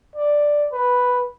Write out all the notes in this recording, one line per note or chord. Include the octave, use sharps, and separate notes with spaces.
D5
B4